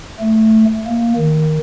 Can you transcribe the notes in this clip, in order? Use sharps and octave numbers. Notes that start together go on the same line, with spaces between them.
A3
A#3
D#3